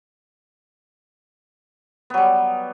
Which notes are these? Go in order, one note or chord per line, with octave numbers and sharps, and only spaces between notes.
F#3 G3 B3